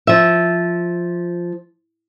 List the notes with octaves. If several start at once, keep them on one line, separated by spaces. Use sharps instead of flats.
F3 E5